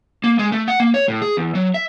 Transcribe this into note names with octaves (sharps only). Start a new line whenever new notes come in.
A#3
G#3
A3
F#5
A#3
C#5
A2
G#4
E2
F#3
E5